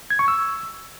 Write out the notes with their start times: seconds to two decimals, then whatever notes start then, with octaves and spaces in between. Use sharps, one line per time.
0.10 G#6
0.19 C#6
0.28 E6